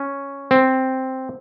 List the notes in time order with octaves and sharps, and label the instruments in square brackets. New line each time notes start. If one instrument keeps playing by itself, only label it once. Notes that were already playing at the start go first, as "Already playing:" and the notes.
Already playing: [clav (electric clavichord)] C#4
C4